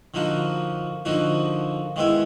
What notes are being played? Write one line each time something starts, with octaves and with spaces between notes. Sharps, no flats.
D3 F3 A#3 D#4 F#4
D3 F3 A#3 D#4 F#4
D#3 G#3 B3 E4